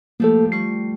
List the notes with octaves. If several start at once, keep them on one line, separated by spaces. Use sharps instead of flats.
F3 A3 A#3 G4 A4
G3 C#6 C7